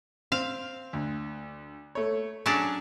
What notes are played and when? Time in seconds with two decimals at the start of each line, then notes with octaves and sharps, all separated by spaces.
0.32 C4 F5
0.93 D2
1.95 A3 C#5
2.46 F#3 C#4 D4 G#4